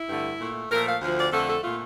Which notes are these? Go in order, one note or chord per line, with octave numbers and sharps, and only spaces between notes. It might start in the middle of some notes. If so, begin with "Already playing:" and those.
Already playing: E4
G2 D3 A3
A#2 A3
A#2 F3 A3 A#4
F5
D2 D3 F3
D5
F2 D3 A3 A4
A4
A#2 A3 F4